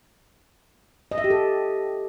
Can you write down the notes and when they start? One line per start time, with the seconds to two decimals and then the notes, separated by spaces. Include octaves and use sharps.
1.12 D#5
1.18 E5
1.24 G4
1.30 A4